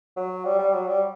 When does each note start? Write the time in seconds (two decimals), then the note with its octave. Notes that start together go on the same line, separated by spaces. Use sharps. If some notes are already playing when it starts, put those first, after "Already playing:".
0.16 F#3
0.44 G3
0.59 G3
0.72 F#3
0.87 G3